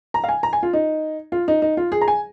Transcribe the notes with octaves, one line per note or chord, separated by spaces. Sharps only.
A#5
F5
G#5
A#5
G#5
F4
D#4
F4
D#4
D#4
F4
G#4
A#5
G#5